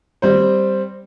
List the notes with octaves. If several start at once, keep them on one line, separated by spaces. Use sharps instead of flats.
G3 C4 C5